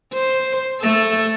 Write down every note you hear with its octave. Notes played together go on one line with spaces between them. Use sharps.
C5
A3 A4